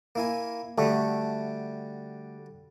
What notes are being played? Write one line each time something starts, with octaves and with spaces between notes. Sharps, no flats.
A#3 E4 G#5
D3 G3 A3 F#4